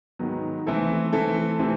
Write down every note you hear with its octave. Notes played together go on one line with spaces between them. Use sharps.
G#2 D#3 F#3 B3
E3 A3 C4 E4 A4
E3 A3 C4 E4 A4
C3 E3 A3 C4